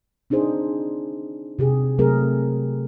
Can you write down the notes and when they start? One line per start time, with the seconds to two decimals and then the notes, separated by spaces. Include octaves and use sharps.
0.30 C4 D4 D#4 G#4 C5
1.59 C3 G4 G#4
1.98 C3 F#3 A3 C4 G#4 A#4